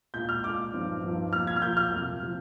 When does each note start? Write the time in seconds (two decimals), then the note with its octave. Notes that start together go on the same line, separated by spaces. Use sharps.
0.14 A#2 G#3 D4 G6
0.29 F6
0.44 A#2 G#3 D4 D6
0.73 G2 F3 C4 D#4
1.03 G2 F3 C4 D#4
1.32 A#2 F3 A#3 F6
1.47 G#6
1.56 F6
1.62 A#2 F3 A#3 G6
1.77 F6
1.92 F2 C3 F3
2.22 C3 F3